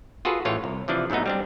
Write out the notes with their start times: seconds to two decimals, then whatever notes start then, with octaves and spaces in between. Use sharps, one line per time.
0.25 F4 F#4 G#4 A4 B4
0.45 A1 A2 E3 F4 C#5
0.64 C2
0.88 C3 E3 F3 D4
1.10 G#2 F#3 A3 B3 D#4
1.26 G3 C4 D4